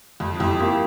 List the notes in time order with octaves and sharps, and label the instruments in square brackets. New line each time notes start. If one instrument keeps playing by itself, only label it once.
[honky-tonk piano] F2
[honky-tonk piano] F2 [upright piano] E4 G4
[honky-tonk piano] A#3 [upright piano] E4 G4